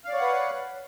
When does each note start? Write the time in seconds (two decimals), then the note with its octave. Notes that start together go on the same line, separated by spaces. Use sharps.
0.05 F5
0.09 D5
0.13 C#5
0.17 F#5
0.21 B4